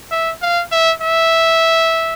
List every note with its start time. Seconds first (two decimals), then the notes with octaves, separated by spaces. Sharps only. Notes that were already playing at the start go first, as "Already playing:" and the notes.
0.11 E5
0.42 F5
0.71 E5
1.01 E5